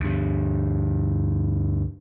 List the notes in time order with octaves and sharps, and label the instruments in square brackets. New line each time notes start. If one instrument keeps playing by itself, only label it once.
[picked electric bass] D2 G2